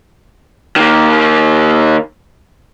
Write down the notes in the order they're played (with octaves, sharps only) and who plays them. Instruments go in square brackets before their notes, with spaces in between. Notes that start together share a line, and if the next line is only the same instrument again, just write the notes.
[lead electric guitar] D#3 A#3